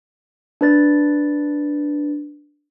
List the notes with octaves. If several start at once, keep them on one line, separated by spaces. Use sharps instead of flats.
D4 B4 A6